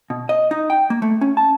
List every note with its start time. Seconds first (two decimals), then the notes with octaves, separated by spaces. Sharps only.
0.10 B2
0.29 D#5
0.51 D#4
0.70 G5
0.90 A#3
1.02 A3
1.21 C#4
1.37 A5